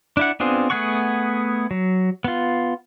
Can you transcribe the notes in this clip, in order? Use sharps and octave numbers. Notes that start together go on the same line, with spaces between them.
D4 E4 F#5
B3 C4 D4 F4 G#4
A3 B3 G#4 F#5 C#6
F#3
B3 F4